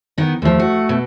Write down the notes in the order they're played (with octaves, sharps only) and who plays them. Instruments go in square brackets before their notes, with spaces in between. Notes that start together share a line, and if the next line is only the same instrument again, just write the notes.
[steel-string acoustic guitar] D#3 B3
[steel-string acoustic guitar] D#2 F3 [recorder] A3
[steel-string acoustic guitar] F#4
B2